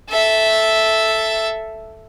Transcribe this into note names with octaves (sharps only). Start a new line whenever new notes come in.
A4 E5